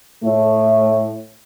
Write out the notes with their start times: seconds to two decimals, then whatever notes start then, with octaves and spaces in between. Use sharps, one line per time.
0.23 A2 A3